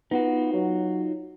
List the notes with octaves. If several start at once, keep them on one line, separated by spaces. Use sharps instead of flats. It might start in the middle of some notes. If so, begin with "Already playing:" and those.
B3 D#4 F4 F#4
F#3